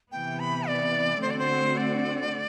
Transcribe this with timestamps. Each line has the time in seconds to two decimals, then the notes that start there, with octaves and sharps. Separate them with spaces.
0.12 C3 E3 B3 G5
0.40 B5
0.68 D5
1.22 D3 A3 C4 F#4 C5
1.31 D5
1.39 C5
1.77 D5